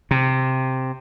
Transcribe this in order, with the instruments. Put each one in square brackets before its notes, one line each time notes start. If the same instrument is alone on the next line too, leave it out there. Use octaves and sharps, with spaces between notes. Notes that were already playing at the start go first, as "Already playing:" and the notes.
[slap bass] C3